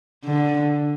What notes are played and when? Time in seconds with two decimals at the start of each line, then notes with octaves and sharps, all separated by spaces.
0.25 D3